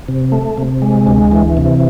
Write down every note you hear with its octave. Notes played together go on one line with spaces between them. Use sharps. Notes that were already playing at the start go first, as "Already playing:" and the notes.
C3
A3
C3
G#3
D2
E3
C3